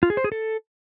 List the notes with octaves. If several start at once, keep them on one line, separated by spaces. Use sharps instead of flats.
F4
G#4
C5
G#4
A4